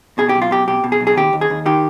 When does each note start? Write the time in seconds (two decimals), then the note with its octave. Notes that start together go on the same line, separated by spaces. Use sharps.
0.18 B2 G#4
0.29 G4
0.35 B1
0.42 F4
0.51 B2 G4
0.68 B2 G4
0.84 B2
0.92 G#4
1.01 B1
1.07 G#4
1.17 D#2 G4
1.33 D#2
1.41 G#4
1.50 D#2
1.66 D#3 G4